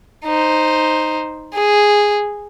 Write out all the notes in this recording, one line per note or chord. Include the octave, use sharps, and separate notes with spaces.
D#4 C5
G#4